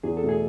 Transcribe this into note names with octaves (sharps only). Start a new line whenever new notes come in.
E2 G#4
A4
B2 A3
G#4